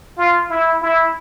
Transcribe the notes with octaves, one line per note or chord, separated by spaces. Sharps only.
F4
E4
E4